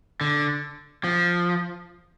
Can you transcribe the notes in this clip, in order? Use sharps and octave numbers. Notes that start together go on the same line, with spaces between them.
D3
F3